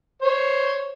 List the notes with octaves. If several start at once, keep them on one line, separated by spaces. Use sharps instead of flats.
C5 C#5